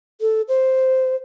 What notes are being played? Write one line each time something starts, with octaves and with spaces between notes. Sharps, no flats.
A4
C5